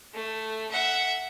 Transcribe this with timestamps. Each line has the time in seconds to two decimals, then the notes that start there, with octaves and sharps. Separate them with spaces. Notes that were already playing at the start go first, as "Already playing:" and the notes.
0.13 A3
0.71 E5 F#5